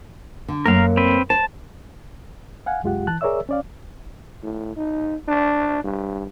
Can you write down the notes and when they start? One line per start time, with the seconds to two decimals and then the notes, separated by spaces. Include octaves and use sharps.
0.48 D3
0.66 F#2 A3 A#3 A#4 F5
0.97 C4 B4
1.30 C5 A5
2.66 F5 F#5 G#5
2.83 C2 F#2 G#3 F4 G4 F#5
3.07 E3 A5 F#6
3.21 G#4 A#4 C#5 D5 E5 E6
3.49 C#4 D5 F5
4.42 A2
4.76 D#4
5.28 D4
5.84 G2